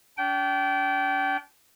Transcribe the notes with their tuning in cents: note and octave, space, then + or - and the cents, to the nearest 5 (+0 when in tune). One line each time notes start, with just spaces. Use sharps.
D4 -40 G5 -25